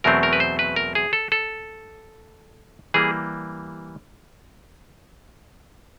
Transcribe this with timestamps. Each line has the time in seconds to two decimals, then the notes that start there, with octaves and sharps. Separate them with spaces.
0.04 E2 B2 F#3 A3 C4 A#4
0.23 A#4
0.33 B4
0.40 C5
0.59 B4
0.76 A#4
0.95 G#4
1.13 A4
1.32 A4
2.94 E3 G3 A#3 G#4